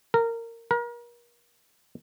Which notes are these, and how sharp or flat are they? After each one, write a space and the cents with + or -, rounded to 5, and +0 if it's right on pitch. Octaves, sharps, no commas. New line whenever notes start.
A#4 -20
A#4 +35